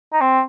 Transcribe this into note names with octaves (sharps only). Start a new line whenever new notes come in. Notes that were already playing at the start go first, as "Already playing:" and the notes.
D#4
C4